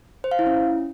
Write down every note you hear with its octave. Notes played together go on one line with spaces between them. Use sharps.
C5
F5
E4
C#4